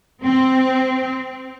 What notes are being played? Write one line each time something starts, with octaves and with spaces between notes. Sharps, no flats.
C4